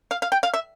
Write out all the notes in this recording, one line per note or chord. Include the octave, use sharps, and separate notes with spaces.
F5
F5
G5
F5
E5